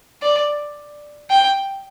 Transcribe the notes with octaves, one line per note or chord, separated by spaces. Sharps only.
D5
G5